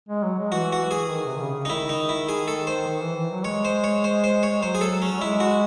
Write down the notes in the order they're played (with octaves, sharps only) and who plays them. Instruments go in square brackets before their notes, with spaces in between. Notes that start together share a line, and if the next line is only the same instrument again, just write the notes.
[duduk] G#3
F#3
G#3
[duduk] E3 [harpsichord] F#4
[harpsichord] F#4
G#4
[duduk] D#3
C3
D#3
C#3
C#3
[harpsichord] D#4
[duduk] D#3 [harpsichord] E4
[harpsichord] D#4
E4
G#4
A4
C5
[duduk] D#3
E3
E3
F#3
[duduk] G#3 [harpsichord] C#5
[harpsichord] C5
C#5
C5
C5
C#5
[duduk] F#3 [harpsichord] C5
[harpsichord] G#4
A4
C#4
[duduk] F#3
[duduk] G#3 [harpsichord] E4
[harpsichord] F#4